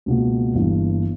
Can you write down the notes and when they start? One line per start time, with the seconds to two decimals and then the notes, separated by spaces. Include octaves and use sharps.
0.06 C#2 B2 A#3
0.55 G1 G2 E3 A#3